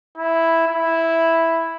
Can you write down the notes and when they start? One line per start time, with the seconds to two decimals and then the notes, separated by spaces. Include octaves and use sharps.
0.18 E4
0.67 E4